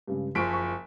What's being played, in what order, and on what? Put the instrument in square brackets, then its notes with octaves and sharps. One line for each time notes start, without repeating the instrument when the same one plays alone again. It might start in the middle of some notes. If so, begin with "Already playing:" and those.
[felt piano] G2 C#3 G#3
[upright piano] F#1 F3 D7 [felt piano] C6 C#6 B6
[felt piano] C#6